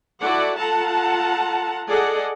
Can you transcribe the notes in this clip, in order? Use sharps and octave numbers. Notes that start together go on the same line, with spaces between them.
E4 F#4 A4 D5 F#5
F4 A4 F#5 A5 A#5
G#4 A4 D5 D#5 F#5